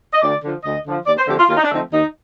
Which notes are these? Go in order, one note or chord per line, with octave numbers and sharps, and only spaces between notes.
D#5
D2 D5
D3 F3
D2 D#5
D3 F3
D#2 D5
C5
D3 F3 A3 C4 G4
F4
D#2 F4
D#4
D4
D3 F3 A3 C4 D#4
D#2 D#4